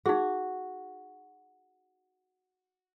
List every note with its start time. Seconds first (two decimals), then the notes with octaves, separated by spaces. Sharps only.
0.06 D#4 F#4 G#4